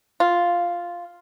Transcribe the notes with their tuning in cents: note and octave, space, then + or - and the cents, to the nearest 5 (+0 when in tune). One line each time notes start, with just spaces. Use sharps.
F4 +0